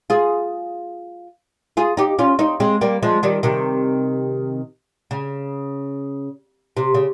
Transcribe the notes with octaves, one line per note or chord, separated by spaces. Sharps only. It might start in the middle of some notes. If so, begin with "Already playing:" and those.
F4 G#4
F4 G#4
D#4 G4
C#4 F4
C4 D#4
G#3 C4
G3 A#3
F3 G#3
D#3 G3
C3 D#3
C#3
C3
C#3